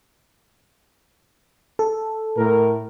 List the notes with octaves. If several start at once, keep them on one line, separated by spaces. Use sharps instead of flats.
A4
A2 A#4